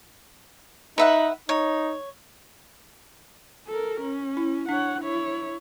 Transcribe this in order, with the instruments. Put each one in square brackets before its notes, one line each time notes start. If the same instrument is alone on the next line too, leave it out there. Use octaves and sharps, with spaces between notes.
[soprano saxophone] D#4 [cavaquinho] B4 E5 F#5
[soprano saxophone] D#4 [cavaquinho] C#5
[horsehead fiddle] A4 A#4
C#4
[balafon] E4
[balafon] D4 [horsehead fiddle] C#5 F#5
[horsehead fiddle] E4 C#5